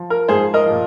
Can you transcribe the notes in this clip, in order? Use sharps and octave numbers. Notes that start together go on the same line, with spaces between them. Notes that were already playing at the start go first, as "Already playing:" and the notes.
Already playing: F3
A#4
G#2 F3 G#4 C5
A#4 D#5
A#2 F3